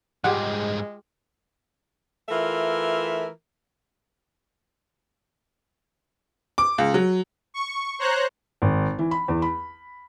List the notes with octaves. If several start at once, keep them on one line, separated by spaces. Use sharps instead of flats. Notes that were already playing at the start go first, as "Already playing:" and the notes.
G#2 G3 G#3 F4 G4 G#4 F#5
E3 A3 F4 A#4 E5
D6
C#2
F#3
C#6
C5 C#5 A#5 F#6
G#1
E3
B5
E2
B5